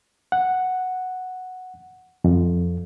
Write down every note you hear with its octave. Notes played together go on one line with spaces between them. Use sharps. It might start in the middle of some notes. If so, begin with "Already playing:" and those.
F#5
F2